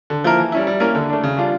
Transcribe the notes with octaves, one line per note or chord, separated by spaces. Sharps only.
D3
F3 A#3 E4 A#4
E3
G3 C#4 E4
G3
A#3 C#4 E4 A#4
D3
A3 D4
C#3
G3 D4 F4